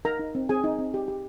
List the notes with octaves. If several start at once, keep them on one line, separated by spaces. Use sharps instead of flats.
D#4 A#4 A#5
D#4
C4
C4 G#4 G#5
D#4
C4
G4
G4